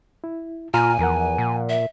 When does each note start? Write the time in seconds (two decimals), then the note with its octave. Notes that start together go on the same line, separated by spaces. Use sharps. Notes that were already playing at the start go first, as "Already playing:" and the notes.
0.24 E4
0.74 A#2 F4 G#5 A#5 F6
0.99 E2 F3 A#4 F#5
1.38 A#2
1.69 E5